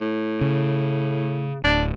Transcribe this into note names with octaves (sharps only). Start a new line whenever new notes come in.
A2
C#3
D1 D4